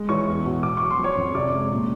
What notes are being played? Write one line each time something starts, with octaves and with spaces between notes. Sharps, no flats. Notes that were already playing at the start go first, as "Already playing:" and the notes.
Already playing: G#3
E3 C#5 C#6
E2
B2
B2 D6
F#3 C#6
C6
F3
C#5 C#6
F2
C3 D5 D6
G#3
A#2